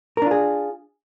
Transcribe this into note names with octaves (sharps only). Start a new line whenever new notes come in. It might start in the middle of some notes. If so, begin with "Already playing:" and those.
D4 F4 G#4 A#4